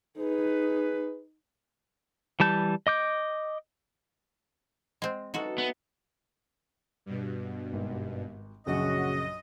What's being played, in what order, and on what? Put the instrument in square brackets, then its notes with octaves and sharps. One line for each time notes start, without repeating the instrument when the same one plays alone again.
[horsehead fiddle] D#4 [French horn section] G#4 B4
[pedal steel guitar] E3 G3 A5 G6
D#5 D6 G6
[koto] G#3 C4
[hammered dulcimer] C#3 E3 F#3 [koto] G#3 F#4 [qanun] D#4 A4
[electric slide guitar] B3
[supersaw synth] G2 B2
[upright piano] G#1
[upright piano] A#1 F#2 [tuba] C#3 [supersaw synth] F#4 [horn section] D#5